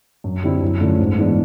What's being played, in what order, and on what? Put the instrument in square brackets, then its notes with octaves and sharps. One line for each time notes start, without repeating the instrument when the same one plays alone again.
[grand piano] F#2
D3 G3 C4 E4
F#2
D3 F3 A3 C#4
G#2
E3 G#3 B3 D4